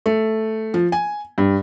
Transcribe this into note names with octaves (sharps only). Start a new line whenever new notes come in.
A3
F3
G#5
G2